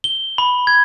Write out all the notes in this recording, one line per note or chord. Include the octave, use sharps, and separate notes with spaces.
G7
B5
G#6